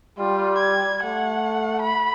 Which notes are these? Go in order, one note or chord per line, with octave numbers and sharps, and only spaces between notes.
G3 F4
G#6
A3 F#5
B5